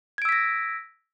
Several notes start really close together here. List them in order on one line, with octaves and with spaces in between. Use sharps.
G#6 D7 E6 B6 A#6